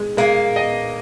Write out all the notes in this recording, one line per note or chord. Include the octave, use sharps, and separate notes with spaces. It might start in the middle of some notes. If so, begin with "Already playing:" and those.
Already playing: G#3
G#3 A#3
D#5